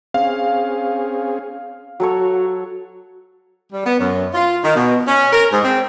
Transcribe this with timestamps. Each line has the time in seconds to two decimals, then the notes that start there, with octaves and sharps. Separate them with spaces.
0.14 C4 C#4 G#4 F5
2.00 F#3 F#4 A4 C#5
3.72 G3
3.86 B3
4.00 F#2
4.34 F4
4.64 D#3
4.76 B2
5.08 C#4
5.33 A#4
5.52 G#2
5.65 C4